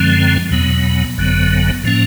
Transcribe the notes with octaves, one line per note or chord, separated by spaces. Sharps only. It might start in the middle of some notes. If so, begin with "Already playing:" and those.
Already playing: F#2 D3 F3 G#3 C4
E2 B2 F#3 B3
G#1 F#2 D3 F#3 B3
A2 F3 A#3 C#4